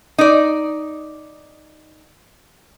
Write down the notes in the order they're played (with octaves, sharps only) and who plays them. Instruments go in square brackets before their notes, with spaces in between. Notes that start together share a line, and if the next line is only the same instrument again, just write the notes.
[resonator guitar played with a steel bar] D#4 D5